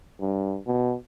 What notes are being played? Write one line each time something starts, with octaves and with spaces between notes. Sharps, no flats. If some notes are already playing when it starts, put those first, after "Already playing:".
G2
B2